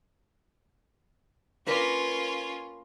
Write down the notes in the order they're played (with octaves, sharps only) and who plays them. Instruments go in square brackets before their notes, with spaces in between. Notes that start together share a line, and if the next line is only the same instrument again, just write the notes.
[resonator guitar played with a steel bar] A#3 A#4 B4 [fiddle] C#4 F4